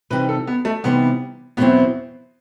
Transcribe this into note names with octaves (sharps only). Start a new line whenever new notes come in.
C3 E3 G3 C4 D#4 B4
A4
B3
A3
C3 E3 G3 B3 C4 D#4
E2 B2 F#3 B3 C4 E4